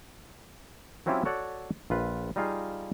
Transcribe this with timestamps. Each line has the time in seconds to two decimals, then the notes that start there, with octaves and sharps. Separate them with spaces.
1.06 F#3 C4 C#4 E4 F4 G4
1.25 F#4 A4 C#5 D5 F#5
1.90 A#1 F4 B4
2.36 G3 D#4 F4 G#4 F5